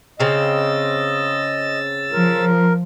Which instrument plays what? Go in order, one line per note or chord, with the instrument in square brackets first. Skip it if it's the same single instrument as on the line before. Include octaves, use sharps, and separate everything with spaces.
[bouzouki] C#3 C4 [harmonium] D#5 [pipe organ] E6 A6
[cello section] F3 [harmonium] A#4